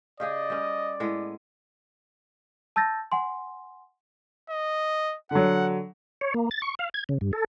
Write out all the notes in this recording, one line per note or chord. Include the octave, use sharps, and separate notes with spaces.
C#3 G4 G#4 D5 D#5
G3 C#4
A2 G#3 B3
A5 E6 G6 A6 A#6
F#5 G#5 C6
D#5
D3 F#3 F#5
C#5
A#3
A6
C#6
F5
G#6
C#3
G2
A4